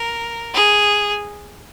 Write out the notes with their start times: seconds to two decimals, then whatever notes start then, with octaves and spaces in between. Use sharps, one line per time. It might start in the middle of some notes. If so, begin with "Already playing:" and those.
Already playing: A#4
0.54 G#4